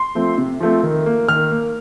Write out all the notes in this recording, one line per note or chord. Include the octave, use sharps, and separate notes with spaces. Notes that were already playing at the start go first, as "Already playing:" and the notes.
Already playing: C6
F3 A3 C4
C3
F3 A3 C4
D#3
A#3
D#3 F6
A#3